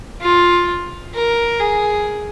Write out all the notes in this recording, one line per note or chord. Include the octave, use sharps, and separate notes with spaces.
F4
A#4
G#4